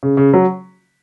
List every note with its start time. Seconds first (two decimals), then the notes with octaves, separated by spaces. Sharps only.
0.03 C#3
0.17 C#3
0.34 F#3